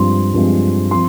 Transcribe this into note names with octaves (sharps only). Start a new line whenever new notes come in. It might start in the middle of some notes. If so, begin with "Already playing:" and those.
Already playing: G2 F3 G#3 C4 C6
G2 F3 G#3 C4
F3 C4 C6